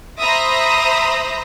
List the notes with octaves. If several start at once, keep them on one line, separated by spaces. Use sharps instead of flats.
C5 E5 A#5 B5 D#6 A#6